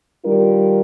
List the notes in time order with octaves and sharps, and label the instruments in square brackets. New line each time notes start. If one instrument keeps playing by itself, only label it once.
[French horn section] D#3 G3 D4 F4 A#4